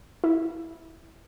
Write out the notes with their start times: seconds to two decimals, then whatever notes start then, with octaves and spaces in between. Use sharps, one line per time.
0.24 E4